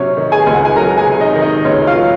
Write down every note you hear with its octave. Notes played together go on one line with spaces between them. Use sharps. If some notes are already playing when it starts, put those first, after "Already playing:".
Already playing: C3 F#3 C#4 C#5
D#3
G#4 G#5
C#2
F#5
G#5
F#3 A#4 A#5
G#4 G#5
C3
D#4 D#5
D#3
D#4 D#5
C#2 C#4 C#5
F4 F5
F#3